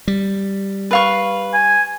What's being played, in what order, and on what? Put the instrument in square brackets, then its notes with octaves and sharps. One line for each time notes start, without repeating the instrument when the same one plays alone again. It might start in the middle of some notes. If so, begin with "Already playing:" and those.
[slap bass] G3
[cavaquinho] B4 F5 C#6
[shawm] G#5